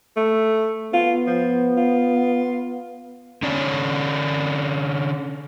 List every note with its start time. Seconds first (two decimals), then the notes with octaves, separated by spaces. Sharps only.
0.17 A3
0.93 B3 F4
1.27 F3
1.77 F4
3.43 D3 C#4 D4 C#5